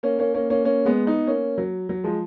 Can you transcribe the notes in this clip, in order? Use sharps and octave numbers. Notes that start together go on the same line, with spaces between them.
A#3 C#4
A#3 C#4
A#3 C#4
A#3 C#4
A#3 C#4
G#3 B3
B3 D#4
A#3 C#4
F#3
F#3
F3 G#3